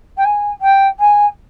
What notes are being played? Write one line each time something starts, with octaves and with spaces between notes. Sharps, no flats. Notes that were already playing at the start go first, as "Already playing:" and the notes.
G5
G#5
G5
G#5